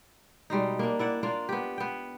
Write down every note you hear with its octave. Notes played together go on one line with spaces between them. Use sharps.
B2 G3 G#3 D#4
A#3 D4
E4 D5 F#5
A#3 D4 F4 D5
B3 G4
B3 G5